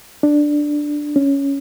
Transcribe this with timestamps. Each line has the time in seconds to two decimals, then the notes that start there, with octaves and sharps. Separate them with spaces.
0.23 D4
1.16 C#4